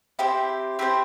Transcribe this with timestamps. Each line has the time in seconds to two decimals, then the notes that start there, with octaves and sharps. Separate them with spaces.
0.19 C4 E4 G4 C5
0.79 C4 E4 G4 C5